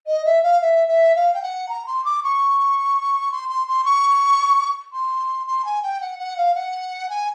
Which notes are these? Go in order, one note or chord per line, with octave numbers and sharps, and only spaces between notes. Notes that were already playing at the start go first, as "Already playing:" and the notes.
D#5
E5
F5
E5
E5
F5
G5
F#5
A#5
C6
D6
C#6
C6
C6
C6
C#6
C6
C6
G#5
G5
F#5
F#5
F5
F#5
G#5